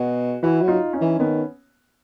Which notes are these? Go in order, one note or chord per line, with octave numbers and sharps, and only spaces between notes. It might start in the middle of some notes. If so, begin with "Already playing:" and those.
Already playing: B2 F#4 G#4
E3 E4 F#4
F#3
D#4 F4
C#4 D#4
E3
D#3 B3 C#4